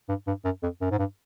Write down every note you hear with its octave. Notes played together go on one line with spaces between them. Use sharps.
G2
G2
F#2
F2
F#2
G#2
G2